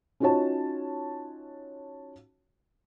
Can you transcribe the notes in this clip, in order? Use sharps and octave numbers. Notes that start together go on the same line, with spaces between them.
C#4 D#4 F4 F#4 C#5 A5